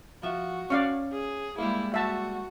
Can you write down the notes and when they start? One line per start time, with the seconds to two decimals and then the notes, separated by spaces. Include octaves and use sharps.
0.23 F3 F#4 E5
0.70 C#4 D5 F5 C#6
1.12 G#4
1.58 G3 G#3 A#3 E4
1.94 F#4 E5 A5